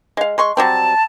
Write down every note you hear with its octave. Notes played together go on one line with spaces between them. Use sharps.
G#3 F5
G#3 C6 C#6
F#3 G3 C4 A5